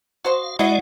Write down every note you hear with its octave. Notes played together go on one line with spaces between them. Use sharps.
F#4 C5 D#5 F5
G#3 E4 F#4 D5 D#5 F#5